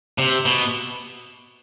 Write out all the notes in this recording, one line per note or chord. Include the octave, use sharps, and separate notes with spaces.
C3
B2